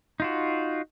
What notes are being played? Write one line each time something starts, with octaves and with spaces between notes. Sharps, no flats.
D#4 F4 F#4